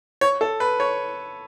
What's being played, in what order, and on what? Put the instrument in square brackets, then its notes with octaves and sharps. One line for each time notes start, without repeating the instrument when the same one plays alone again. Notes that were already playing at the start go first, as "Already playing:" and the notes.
[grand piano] C#5
A4
B4
C#5